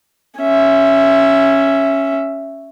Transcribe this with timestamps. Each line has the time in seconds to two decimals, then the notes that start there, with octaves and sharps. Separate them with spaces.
0.40 C#4 E5